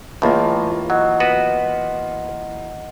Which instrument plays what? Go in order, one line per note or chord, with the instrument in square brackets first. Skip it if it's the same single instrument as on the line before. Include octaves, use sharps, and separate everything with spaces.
[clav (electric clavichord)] C#2 A2 [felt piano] E3 A#3 F4
[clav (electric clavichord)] F#3 [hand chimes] D#5 F#5
[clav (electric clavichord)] B3 F#4 B4